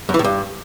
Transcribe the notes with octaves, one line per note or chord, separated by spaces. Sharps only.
F#2
E3
A2
G2